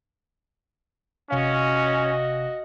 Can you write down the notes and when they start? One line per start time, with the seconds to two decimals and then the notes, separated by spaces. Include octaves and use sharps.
1.31 G1 C3 C#4 F#4 D#5 F5